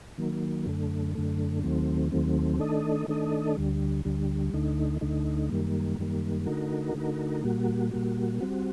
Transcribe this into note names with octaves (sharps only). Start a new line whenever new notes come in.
D#3 F#3 A#3
F#2 D3 A3
F#2 D3 A3
D#2 D#3 F#3 A3 C4
D#2 D#3 F#3 A3 C4
D#3 A3 D4 A4 D#5
D#3 A3 D4 A4 D#5
D2 D3 G3
D2 D3 G3
D2 D3 A3 D#4
D2 D3 A3 D#4
F#2 D#3 G3 A#3
F#2 D#3 G3 A#3
D3 A3 D#4 F#4 A#4
D3 A3 D#4 F#4 A#4
A#2 G3 A#3 F#4
A#2 G3 A#3 F#4
G3 C4 F#4